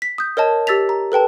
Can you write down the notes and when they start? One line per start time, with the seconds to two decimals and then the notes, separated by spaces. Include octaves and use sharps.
0.02 B6
0.18 D#6 G6
0.37 A#4 C#5 D#5 A5
0.67 G4 E6 A6 B6 F7
0.89 A#5
1.12 A4 B4 G5 A5